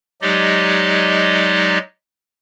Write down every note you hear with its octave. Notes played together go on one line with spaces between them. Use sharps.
F#3 G#3 D#4 G4 D5 D#5